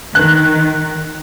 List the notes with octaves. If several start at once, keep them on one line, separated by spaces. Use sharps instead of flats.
D#3 F#6